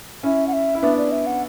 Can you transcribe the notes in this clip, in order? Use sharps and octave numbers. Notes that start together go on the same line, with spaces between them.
C#4 E4 E5
F#5
E5
E4
B3 D4 E5
D5
E5
F#5